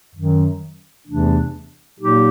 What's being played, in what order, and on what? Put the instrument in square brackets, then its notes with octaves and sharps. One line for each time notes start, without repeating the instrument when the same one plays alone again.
[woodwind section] F#2 D#3 F#3
E2 C3 E3 A3 D4
A#2 F#3 A#3 D#4 G4